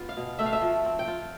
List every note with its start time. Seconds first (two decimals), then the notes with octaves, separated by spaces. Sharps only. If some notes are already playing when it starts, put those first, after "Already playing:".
Already playing: B3 F4
0.09 F5
0.17 B2
0.39 A3 E5
0.46 F5
0.53 E5
0.62 F3
0.85 C4
0.99 G5
1.08 F4